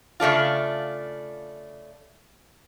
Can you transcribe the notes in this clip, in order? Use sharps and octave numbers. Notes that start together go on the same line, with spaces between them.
C#3 A3 D4 F4